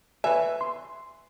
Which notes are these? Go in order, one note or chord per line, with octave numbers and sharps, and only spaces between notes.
B4 C#5 E5 G#5
C6